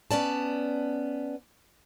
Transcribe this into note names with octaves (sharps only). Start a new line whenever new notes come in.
B3 C#4 D5 A5